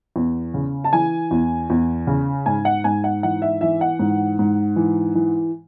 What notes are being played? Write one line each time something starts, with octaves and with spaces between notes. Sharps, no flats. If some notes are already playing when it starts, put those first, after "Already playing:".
E2
C#3
A5
E3 G#5
E2
E2
C#3
G#2 G#5
F#5
G#2 G#5
F#5
E3 F#5
E5
E3 E5
F#5
G#2
G#2
E3
E3